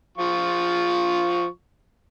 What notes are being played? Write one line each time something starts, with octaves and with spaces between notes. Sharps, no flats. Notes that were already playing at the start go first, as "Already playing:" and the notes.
F3 F4 C#6